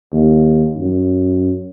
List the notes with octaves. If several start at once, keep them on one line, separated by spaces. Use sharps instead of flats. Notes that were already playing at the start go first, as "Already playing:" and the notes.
D#2
F#2